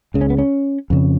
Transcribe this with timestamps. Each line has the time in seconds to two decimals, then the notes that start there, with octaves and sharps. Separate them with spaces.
0.14 C#2 C#3
0.21 C#4
0.30 B3
0.38 C#4
0.90 F2 C#3